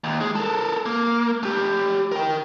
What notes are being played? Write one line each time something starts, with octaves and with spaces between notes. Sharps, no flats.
D#2
G#3
A4 A#4
A#3
A3 G4
A#4 G5